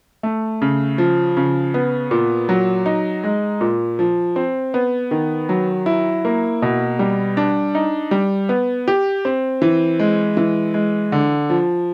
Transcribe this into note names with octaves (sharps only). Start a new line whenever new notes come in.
A3
C#3
F3
C#3
B3
A#2
F#3
D#4
G#3
A#2
F3
C4
B3
D#3
F#3
E4
A#3
B2
G3
D4
D#4
G3
B3
G4
C4
E3
G#3
E3
G#3
D3
F3